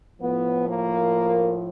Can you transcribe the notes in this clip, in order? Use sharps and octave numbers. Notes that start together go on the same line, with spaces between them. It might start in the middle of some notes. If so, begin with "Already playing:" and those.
A2 F3 B3
A#3